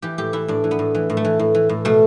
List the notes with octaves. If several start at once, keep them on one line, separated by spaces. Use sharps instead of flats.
E3 G4
A2 G4
E3 E4
A2 D4
E3
B3
A2
E3
A2
A3
E3
A2
E3
A2
B2 A3